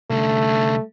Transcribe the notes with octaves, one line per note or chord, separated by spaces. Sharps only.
C2 D3 A3